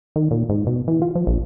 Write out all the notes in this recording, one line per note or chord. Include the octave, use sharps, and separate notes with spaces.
D#3
A#2
G#2
B2
E3
F4
F3
A#1